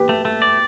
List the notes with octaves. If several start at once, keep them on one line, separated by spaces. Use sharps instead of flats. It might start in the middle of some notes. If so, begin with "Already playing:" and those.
Already playing: G4 B4
A3
A3
D5